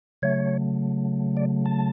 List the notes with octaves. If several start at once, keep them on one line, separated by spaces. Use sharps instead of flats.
C#3 F#3 A3 C#5
D5
A5